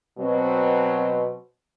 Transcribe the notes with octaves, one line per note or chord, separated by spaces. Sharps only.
B2 F#3 C4